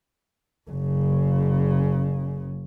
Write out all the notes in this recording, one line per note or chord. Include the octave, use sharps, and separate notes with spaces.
F#1 C#3